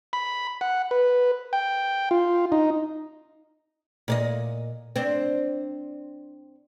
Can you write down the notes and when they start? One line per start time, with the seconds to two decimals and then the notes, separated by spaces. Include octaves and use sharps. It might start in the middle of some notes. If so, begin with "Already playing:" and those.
0.13 B5
0.61 F#5
0.91 B4
1.53 G5
2.11 F4
2.52 D#4
4.08 A#2 D5 D#5
4.96 C4 D4